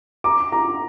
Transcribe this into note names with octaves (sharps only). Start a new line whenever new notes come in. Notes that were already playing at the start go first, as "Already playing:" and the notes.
A#5 D6
A#5 D6